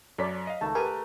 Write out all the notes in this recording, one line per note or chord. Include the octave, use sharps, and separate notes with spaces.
F#2 A4 C#5 D5 B6
D#5 F5
C#2 D#3 A3 A5 A#5
G4 A#4 B4 G#5 A5